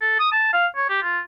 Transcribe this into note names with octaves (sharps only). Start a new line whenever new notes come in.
A4
D#6
A5
F5
C#5
G4
F4